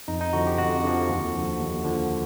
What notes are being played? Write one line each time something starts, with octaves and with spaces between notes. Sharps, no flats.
F2 D#4
D#4
D3 F3 F#4
G4
F2 F#4
D3 F3
D#2
D3 F3
D#2
D3 F3